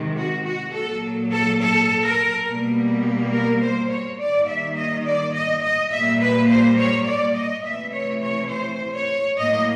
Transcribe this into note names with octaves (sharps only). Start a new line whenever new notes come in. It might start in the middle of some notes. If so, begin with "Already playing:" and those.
Already playing: C3 D#3 G#3
F#4
F#4
A#2 F#3 A#3 A4
A4
A4
A#4
B2 G3 A#3
A#4
C5
C#5
D#3 G3 A#3 D5
E5
D#5
D5
D#5
D#5
A#2 G3 A#3 E5
B4
C5
C#5
D5
D#5
C3 E3 A3 E5
C#5
C#5
C5
C#5
A2 F#3 A#3 D#5